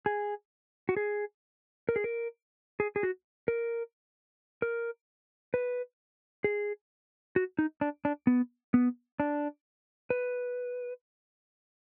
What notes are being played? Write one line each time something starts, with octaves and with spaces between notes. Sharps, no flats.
G#4
F#4
G#4
A#4
G#4
A#4
G#4
G#4
F#4
A#4
A#4
B4
G#4
F#4
D#4
D4
D4
B3
B3
D4
B4